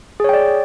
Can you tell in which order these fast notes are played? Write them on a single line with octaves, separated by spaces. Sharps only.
G#4 C#5 G5 D5